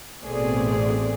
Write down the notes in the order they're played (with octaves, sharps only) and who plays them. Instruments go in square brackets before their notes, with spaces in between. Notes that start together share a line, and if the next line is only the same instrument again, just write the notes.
[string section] A1 B2 A3 C4 G#4 D5